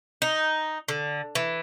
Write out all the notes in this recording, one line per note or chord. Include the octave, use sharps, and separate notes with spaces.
D#4
D3
E3